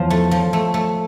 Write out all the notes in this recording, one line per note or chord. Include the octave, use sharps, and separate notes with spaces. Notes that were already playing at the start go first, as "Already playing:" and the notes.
Already playing: E2 F3
A3
F3
A3
A3